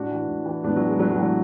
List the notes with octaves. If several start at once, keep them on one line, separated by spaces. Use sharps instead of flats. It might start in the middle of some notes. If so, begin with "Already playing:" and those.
Already playing: A2 D4 F#4
E3
A2
E3
A2 B3 D4
F#3
E3
G#3
A2 F#3 A3
F#3
E3
F#3